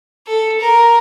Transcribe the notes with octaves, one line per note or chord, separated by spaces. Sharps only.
A4
A#4